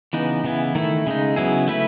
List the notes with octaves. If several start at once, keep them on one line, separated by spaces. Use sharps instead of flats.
C#3 E3 B3 D#4
C#3 E3 B3 E4
D#3 A3 E4
C#3 G#3 D#4
C#3 F#3 B3 E4 G#4
A3 E4 B4